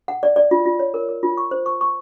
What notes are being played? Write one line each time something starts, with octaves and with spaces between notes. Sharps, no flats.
F#5
D5
D5
F4
F4
C#5
A#4
A#4
F4
C#6
C5
C#6
C#6